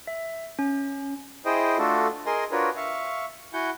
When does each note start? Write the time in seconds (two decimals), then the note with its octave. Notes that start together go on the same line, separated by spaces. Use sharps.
0.07 E5
0.59 C#4
1.45 E4 G#4 C5 D#5 G5
1.78 A3 D4 F4 F#4 A4
2.26 G#4 A#4 D#5 G#5 C6
2.52 D4 F4 F#4 A#4 B4 C#5
2.76 E5 F5 C#6
3.53 E4 F#4 F#5 G#5 G6